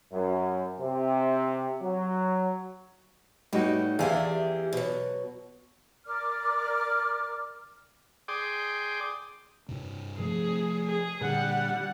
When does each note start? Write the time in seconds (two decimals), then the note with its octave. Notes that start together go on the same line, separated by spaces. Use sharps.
0.12 F#2
0.79 C3
1.81 F#3
3.53 A2 G3 B3 D#4 F#4
3.99 E2 E4 G4 G#4 D5 F5
4.73 B2 F#3
6.06 A#4 D5 D6 F6
8.28 G#4 D5 G5 C6 D6 D#6
9.69 G2 C3
10.18 C3 F3 A3 G#4
10.86 G#4
11.21 A#2 D3 G3 F#5